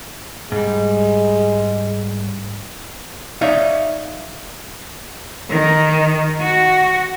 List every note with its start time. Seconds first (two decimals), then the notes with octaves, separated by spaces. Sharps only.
0.52 G#2 G3 G#3
3.41 D#4 C#5 D5 E5 F5
5.49 D#3
6.41 F#4